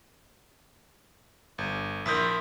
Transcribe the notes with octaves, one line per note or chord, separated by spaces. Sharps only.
G1
A#1 E4 A#4 C6 D#6 G6 B6